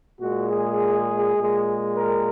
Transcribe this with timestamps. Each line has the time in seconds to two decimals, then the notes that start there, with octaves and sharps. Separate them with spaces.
0.19 A#2 G#3 F#4
0.48 G#4
1.36 A#2 G#3
1.95 A#4